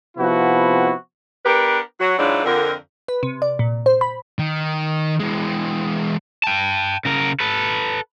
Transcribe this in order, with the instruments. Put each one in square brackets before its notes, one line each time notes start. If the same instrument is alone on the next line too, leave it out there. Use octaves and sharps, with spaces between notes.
[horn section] C3 F3 B3 C4 E4 F#4
[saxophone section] B3 D4 G4 A#4 B4
F#3 F#4
G#2 E3 F#3 D4 D#4 F4
F2 D3 A#4
[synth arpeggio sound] B4
C3
D5
A#2
C5
B5
[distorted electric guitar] D#3
E3 G#3
[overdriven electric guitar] G5 A5
C#3 A#4
A4 B4